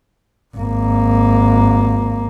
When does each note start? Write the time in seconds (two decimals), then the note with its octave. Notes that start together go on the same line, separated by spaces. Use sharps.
0.57 G#1 A#3